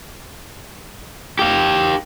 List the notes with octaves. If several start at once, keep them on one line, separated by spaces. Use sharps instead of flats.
G4 F5